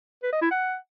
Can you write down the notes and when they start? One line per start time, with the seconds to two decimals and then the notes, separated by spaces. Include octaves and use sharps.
0.23 B4
0.32 D#5
0.42 E4
0.51 F#5